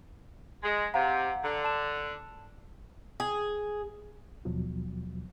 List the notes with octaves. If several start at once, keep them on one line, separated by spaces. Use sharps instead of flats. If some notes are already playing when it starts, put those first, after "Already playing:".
G#3
C3 F5 F#5 A#5
D3 A#5
A5 E7
G#4
D#2 B2 F3 F#3